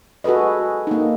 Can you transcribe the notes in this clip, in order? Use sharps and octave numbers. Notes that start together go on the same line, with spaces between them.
F#4 G#4 A4 B4 D#5
A#3 D#4